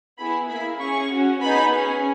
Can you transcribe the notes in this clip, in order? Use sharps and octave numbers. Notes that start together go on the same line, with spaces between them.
B3 E4 G#4 B5
A#3 E4 G#4 B5
C#4 G#4 C#6
C#4 F#4
B3 D#4 G#4 B5
C#4 G#4